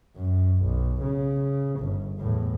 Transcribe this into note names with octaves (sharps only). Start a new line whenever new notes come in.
F#2
B1
C#3
G1
E2 A2